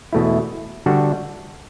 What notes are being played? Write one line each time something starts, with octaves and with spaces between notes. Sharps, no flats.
E2 B2 A3 E4
D3 G3 D4 F#4 A4